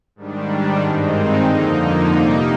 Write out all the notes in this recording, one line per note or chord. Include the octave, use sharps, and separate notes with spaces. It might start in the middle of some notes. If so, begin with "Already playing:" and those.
G#2 D#3 G3 D4
G2 D#3 G#3 C4 D#4
F2 D3 F3 A#3 D#4
C3 G3 A#3 D#4